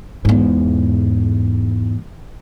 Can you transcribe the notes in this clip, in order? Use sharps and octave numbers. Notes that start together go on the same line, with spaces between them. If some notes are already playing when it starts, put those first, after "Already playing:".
E2 G#2